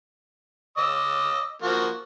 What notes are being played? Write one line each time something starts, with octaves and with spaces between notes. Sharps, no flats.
D#5 D6 E6
F3 A#3 F#4